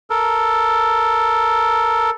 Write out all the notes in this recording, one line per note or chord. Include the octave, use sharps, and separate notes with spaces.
A4 A#4